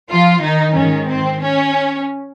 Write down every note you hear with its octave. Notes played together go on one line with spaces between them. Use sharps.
F3 F4
D#3 D#4
G#2 D#3 C#4
C4
C#4